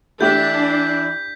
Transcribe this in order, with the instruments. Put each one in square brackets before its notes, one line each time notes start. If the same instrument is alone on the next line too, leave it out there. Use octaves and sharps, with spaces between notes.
[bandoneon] E3 E4 [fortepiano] A3 G4 [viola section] D4 [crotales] G6 B6